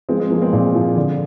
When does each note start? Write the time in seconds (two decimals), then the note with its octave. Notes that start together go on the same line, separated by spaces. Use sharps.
0.09 F3 G#3 C4
0.20 G#3
0.30 F3 A#3
0.42 G#3 C4
0.53 A#2
0.75 F3
0.96 D3